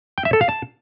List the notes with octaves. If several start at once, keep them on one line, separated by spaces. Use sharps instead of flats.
G5
E5
A4
F5
A5